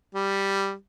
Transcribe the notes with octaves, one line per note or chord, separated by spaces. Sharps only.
G3